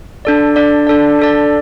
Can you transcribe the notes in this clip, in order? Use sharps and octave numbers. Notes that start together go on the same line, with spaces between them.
D4 A4 D5
D4 A4 D5
D4 A4 D5
D4 A4 D5